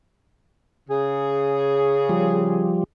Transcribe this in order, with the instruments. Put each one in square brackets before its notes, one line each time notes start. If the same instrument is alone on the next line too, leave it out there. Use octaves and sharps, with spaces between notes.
[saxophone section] C#3 G#4
[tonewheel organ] F3 G3